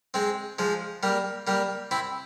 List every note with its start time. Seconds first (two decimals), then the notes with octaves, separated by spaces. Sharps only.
0.14 G#3 C4
0.59 F3 G#3
1.03 G3 A#3
1.47 G3 A#3
1.91 C4 E4